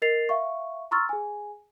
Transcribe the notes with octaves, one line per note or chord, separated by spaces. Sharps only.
A#4 D#5 A6 C7 F7
E5 F5 C#6
A#5 C6 C#6 E6 F6 A6
G#4 G#5